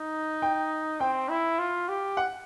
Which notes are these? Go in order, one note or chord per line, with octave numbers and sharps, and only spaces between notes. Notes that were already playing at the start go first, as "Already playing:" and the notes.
Already playing: D#4
G5
C4 G5
E4
F4
G4
F#5